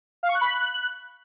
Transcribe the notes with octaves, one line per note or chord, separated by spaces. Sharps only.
F5
C#6
F#6
B5
F#6